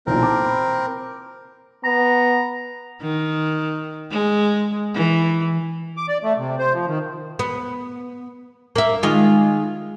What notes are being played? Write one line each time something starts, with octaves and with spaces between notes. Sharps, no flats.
B1 E2 A#2 C4 A#4
A5 D6
B5
B3 A#5
D#3
G#3
E3
D6
D5
A3
C3
C5
F3
D#3
B3
A#3 E5
D#3 G#3 F4